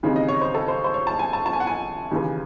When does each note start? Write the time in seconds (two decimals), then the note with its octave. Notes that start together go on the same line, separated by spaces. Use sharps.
0.03 D#2 C#3 E3 C4 D#4
0.16 D#5
0.28 C#5
0.41 C5
0.55 A4
0.68 C5
0.84 C5
0.94 C#5
1.07 A5
1.19 G#5
1.33 A5
1.46 A5
1.53 G#5
1.60 F#5
1.67 G#5
2.11 D#2 C#3 E3